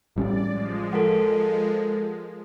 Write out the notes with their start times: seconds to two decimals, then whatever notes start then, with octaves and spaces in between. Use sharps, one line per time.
0.16 A1 G3 C#4 D5
0.48 F3 G#3
0.93 A4 A#4 F#5